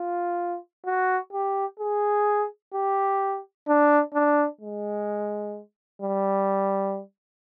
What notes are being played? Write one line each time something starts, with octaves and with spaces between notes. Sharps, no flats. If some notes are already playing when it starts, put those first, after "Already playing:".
Already playing: F4
F#4
G4
G#4
G4
D4
D4
G#3
G3